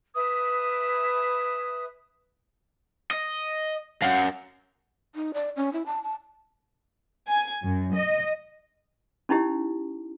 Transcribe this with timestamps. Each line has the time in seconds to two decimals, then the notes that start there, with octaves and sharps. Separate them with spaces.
0.15 B4 E5 D#6
3.11 D#5
4.02 F#2 F5 F#5 G6
5.15 D#4
5.34 D5
5.56 C#4
5.73 E4
5.86 A5
6.04 A5
7.28 G#5
7.64 F#2
7.95 D#5
9.29 C#4 D#4 E4 G4